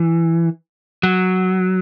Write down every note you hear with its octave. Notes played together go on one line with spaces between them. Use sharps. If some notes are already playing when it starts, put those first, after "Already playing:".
Already playing: E3
F#3